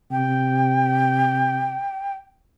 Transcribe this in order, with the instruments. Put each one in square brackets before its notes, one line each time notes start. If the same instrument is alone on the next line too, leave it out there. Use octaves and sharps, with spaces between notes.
[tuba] C3 [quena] G5